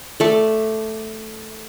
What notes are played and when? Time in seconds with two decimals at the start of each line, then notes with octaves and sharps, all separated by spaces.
0.20 A3 D5